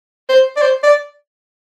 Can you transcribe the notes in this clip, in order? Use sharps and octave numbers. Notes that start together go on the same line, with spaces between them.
C5
D5
C5
D5